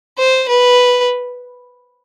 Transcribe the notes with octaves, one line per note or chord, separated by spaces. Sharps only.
C5
B4